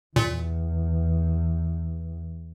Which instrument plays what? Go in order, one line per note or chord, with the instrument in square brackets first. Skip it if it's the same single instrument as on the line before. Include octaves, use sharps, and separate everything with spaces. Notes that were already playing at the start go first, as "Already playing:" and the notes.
[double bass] E2 [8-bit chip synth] A#2